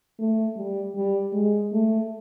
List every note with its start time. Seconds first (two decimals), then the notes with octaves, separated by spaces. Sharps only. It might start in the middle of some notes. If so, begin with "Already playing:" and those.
0.19 A3
0.57 G3
0.95 G3
1.33 G#3
1.72 A3